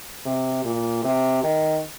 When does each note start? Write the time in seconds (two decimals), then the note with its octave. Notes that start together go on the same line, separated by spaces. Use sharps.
0.25 C3
0.65 A#2
1.04 C3
1.44 D#3